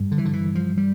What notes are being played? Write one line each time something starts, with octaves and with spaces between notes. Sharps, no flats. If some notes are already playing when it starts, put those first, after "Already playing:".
Already playing: G2
D3
E3
D3
E3
F3
G3